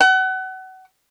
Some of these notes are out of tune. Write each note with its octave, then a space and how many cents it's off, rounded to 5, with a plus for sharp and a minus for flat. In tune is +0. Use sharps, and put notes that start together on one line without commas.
F#5 +30